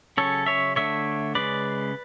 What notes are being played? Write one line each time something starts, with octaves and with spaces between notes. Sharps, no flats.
C#3 F#3 C#4 A4 C#5
C#5 E5
D3 A3 D4 C#5 E5
C#3 G#3 C#4 B4 D5